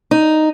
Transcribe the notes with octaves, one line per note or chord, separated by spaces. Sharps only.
D#4